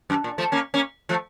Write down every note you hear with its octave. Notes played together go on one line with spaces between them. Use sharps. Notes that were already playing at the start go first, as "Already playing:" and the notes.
F#2
A#2
F3 A3
A#3 C#4
A#3 C#4
F3 A3